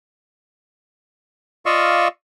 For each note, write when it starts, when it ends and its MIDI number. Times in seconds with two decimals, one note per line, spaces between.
1.66 2.08 65
1.66 2.08 74
1.66 2.08 75
1.66 2.08 77
1.66 2.08 85
1.66 2.08 88